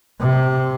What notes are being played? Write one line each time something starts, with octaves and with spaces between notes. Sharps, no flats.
C3